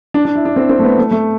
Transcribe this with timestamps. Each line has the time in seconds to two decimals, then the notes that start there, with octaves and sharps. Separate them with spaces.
0.14 D4
0.25 D4
0.35 E4
0.45 D4
0.56 C4
0.69 C4
0.79 A3
0.84 B3
0.98 A3
1.11 A3